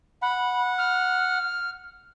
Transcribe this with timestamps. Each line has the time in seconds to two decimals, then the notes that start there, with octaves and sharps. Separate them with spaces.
0.22 F#5 B5
0.78 F6